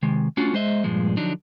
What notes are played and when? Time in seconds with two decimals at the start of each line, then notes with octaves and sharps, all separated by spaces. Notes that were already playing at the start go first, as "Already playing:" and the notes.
0.02 C3 D#3 G#3
0.37 A3 C#4 D4 F4 F#4
0.54 G#3 C5 D#5 E5
0.84 G2 A#2 F3 G#3
1.17 D3 F3 F#3 D4 D#4